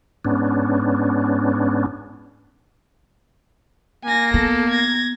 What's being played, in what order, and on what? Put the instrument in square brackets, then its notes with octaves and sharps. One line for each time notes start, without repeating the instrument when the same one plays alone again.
[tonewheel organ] G#2 B3 C#4 D4
[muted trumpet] A#3 [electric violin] G#5 A#6
[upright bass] B3 [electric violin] A4
[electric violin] G#6 A#6